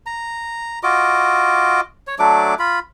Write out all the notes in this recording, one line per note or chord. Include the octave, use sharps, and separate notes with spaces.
A#5
F4 F#4 D#5 D6
C#5
F#3 A3 D4 D6
F4 B5